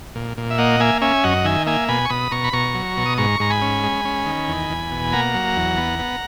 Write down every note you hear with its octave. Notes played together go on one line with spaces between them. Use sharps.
A#2
A#2
E5
A#3 D#5 F#5
A#3 E5 G#5
C#4 E5 G#5
F#2 D#5 F#5
D#3 E5 G#5
A#3 E5 G#5
B2 G#5 B5
C#6
B2 B5 D#6
B2 A#5 C#6
B5
B2 A#5 C#6
F#3
B2
D#6
G#2 A#5 C#6
G#2 A#5
G#5 B5
C#4
G#3
C#4
D#3
E2
E2
B2
A#3 F#5 A#5
F#3
E2
B3
B3